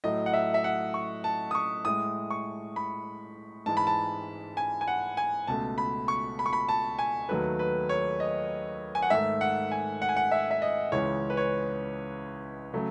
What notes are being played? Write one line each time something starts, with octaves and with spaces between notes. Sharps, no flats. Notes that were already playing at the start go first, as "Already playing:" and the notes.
A2 F#3 A3 D#5
F#5
E5
E5
F#5
C#6
A5
D#6
C#6
A2 G#3 D#6
C#6
B5
G#2 E3 G#3 A5
B5
A5
G#5
G#5
F#5
G#5
C#2 B2 A3 A5
B5
C#6
B5
C#6
B5
A5
G#5
D#2 D#3 F#3 A3 B4
B4
C#5
D#5
G#5
F#5
G#2 D#3 A3 E5
F#5
G#5
F#5
G#5
F#5
E5
E5
D#5
C#2 C#3 E3 G#3 C#5
B4
C#5
C#3 F#3 A3